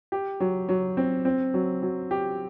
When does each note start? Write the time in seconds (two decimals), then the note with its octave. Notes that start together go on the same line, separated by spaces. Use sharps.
0.12 G4
0.40 F#3
0.69 F#3
0.97 C4
1.25 C4
1.54 F#3
1.82 F#3
2.11 G4